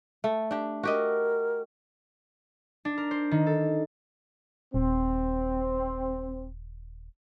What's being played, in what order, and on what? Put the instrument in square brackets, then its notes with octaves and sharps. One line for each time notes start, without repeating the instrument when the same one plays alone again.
[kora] A3
D4 G4
[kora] F#4 G4 D#5 [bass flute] A#4
[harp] D4
A#4
C5
D#3
A4
[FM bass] D#1 [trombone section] C4